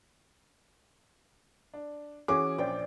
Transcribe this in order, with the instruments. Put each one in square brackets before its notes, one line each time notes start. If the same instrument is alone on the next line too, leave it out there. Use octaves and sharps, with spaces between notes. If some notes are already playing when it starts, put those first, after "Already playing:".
[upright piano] D4
[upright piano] E3 F#4 G#4 [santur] C#4 [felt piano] D6
[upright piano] A#1 G5 [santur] C5 D5